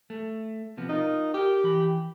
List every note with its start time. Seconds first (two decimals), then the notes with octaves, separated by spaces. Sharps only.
0.10 A3
0.77 C3 F3 B3
0.89 D#4 F4 A#4
1.34 G4 A#4 G5
1.64 E3 B5